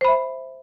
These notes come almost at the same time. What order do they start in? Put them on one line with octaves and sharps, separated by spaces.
C5 B5 E5